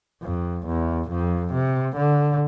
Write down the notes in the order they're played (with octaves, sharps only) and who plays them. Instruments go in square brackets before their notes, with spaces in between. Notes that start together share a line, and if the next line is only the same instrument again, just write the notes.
[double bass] F2
E2
F2
C3
D3